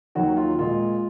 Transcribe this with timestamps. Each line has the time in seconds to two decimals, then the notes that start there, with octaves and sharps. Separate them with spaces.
0.15 D#2 D#3 F#3 F#4
0.37 F4
0.59 A#2 G#3 F4